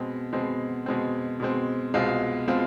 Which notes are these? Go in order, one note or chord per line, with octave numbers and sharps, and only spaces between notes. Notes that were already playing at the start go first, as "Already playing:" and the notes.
Already playing: B2 G#3 C4
B2 G#3 C4
B2 G#3 C4
B2 G#3 C4
C2 B2 G#3 C4 F4
B2 G#3 C4 F4